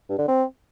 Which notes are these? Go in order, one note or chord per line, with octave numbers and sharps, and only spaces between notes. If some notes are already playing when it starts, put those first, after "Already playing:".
G2
D3
C4